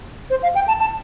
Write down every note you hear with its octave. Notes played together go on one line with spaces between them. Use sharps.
C5
F5
G5
A5
A5